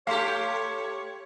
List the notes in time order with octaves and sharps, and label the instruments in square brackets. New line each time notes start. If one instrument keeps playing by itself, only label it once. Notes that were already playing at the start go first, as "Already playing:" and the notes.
[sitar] A3 G4 [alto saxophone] C#5 [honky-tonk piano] F5 C6 B6